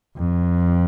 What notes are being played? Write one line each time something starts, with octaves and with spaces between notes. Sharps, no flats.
F2